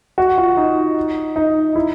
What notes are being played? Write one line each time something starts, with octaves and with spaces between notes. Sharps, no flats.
F#4
F4
D#4
D#4
E4